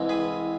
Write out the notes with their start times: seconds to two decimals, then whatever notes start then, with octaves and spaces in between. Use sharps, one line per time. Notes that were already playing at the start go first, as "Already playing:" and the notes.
Already playing: C2 C3 E3 G#3
0.09 G#4 B4